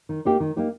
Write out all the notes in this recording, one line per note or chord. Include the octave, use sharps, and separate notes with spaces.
D#3
A#3 D#4 G4
D#3
A#3 D#4 G4